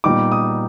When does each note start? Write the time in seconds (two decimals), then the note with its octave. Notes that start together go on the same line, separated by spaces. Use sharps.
0.04 A#2 G3 B3 D#4 D6
0.32 D#6